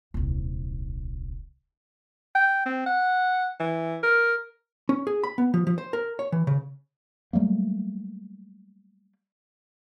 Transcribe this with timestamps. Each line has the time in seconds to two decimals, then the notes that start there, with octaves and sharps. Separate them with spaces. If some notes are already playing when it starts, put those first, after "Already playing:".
0.14 D#1 C2
2.35 G5
2.66 C4
2.86 F#5
3.60 E3
4.03 A#4
4.89 C#4
5.07 G#4
5.23 B5
5.38 B3
5.54 F3
5.67 F3
5.78 C5
5.93 A#4
6.19 C#5
6.32 E3
6.47 C#3
7.33 F#3 G3 A3 A#3